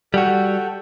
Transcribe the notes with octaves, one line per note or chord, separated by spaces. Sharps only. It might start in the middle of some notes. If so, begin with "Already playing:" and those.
G3 F#4 A4 F#5 G5